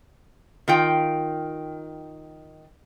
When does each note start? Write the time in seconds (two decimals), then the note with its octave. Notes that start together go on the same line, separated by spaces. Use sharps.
0.68 D#3 F4 G5